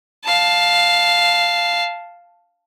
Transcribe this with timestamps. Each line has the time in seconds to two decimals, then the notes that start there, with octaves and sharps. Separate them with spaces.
0.25 F5 A5